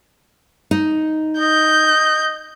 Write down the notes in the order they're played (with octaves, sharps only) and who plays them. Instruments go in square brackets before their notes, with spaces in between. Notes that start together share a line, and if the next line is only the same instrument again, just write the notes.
[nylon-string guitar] D#4
[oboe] D#5 [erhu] G6